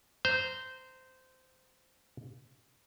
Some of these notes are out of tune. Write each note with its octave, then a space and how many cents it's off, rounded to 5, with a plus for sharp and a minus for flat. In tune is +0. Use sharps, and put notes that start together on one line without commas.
C5 -15 A#5 -15